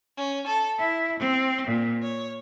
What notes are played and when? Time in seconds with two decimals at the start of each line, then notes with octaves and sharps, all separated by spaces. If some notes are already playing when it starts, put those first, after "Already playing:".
0.15 C#4
0.46 A4
0.78 E4
1.19 C4
1.66 A#2
2.01 C#5